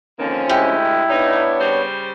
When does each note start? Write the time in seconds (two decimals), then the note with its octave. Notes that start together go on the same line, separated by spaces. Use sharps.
0.19 D3 D#3 F3 A#3 C4 C#4
0.50 D2 G#3 E4 G4
1.09 B3 D4 D#4 C#5
1.60 C#3 G3 C5